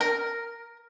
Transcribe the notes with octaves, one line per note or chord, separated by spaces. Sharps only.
A#4